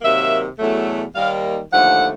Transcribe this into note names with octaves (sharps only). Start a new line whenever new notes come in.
C3 D#3 F#3 A#3 E5
E2 B2 F#3 A3
D#2 D#3 G3 A#3 F5
D#2 D3 F3 A3 F#5